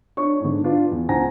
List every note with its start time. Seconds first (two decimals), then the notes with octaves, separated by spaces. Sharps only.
0.17 D4 C#5 C#6
0.40 G#2 D3
0.64 D4 F4 B4
0.92 E2
1.09 C#2 C5 F#5 G#5 A#5 A#6